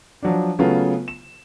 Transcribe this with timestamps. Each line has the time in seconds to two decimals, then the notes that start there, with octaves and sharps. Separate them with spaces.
0.23 F3 F#3 D4
0.59 C#3 F#3 A3 B3 F4
1.08 E7